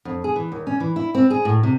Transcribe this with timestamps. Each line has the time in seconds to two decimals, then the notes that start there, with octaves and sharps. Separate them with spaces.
0.05 F2
0.24 G#4
0.36 E3
0.52 D#2
0.67 C#4
0.80 E3
0.96 E4
1.15 C4
1.30 G#4
1.45 A2
1.63 C3